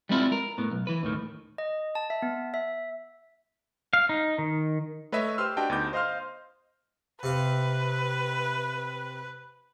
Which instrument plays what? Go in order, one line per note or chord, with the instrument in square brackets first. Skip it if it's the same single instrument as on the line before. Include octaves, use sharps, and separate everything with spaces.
[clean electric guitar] G3 G#3 B3 C4 E4 F4
A#4
A2 B3
B1
E3 B4
D#2 A2 D#3
[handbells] D#5
A5
E5
B3
E5
[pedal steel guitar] F5
D#4
D#3
[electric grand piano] A3 B4 C#5 D#5 E5
G4 B4 C5 C6 E6 F6
D4 F#4 G4 D#5 G5 A5
D2 B3 D#4 D6 G6
C5 D#5 F5 C6 F6
[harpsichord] C3 F5 [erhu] B4